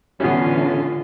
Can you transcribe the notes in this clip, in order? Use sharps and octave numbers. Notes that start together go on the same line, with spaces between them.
A2 D3 E3 G3 B3 C#4 F4